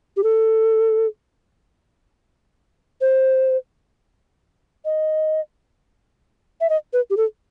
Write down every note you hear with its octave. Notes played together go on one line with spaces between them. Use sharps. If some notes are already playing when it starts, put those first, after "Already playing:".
G4
A4
C5
D#5
E5
D#5
B4
G4
A4